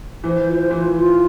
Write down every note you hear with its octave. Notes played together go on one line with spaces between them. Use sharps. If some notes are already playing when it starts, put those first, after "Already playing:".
E3 C5
F4
E3 F4
F4